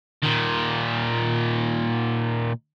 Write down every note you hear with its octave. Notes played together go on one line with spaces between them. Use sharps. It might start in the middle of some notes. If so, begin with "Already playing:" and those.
A#2 D#3